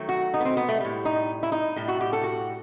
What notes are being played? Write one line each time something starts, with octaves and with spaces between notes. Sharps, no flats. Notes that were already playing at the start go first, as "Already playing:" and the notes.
Already playing: D#3 F#3 A3
F#4
D#4
B3
C4
B3
A3
A2 G3
D#4
E4
D#4
A2 G3
F#4
G4
A4
F#4